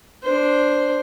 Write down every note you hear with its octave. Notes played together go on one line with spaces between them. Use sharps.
D4 C5